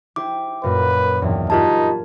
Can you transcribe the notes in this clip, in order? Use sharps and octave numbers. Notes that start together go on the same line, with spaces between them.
E4 G4 C5 D6
F#2 A#2 B4
B1 E2 G2
D#4 F4 G4 A#4 A5 F6 G#6